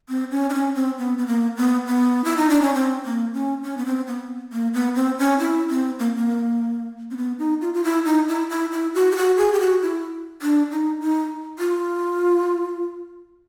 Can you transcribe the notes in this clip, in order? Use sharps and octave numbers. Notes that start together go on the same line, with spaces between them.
C4
C#4
D4
C#4
C4
B3
B3
A#3
B3
B3
E4
D#4
D4
C#4
C4
A#3
C#4
C#4
B3
C4
B3
A#3
B3
C4
C#4
E4
C4
A#3
A#3
C4
B3
D#4
F4
F4
E4
D#4
E4
E4
E4
F#4
G4
F#4
G#4
G4
F#4
E4
D4
D#4
D#4
F4